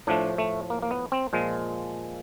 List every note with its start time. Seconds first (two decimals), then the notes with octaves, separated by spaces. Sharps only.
0.07 A2 F3 A3 D4
0.38 A3
0.70 A#3
0.83 A#3
0.91 B3
1.12 C4
1.33 A#2 F3 G#3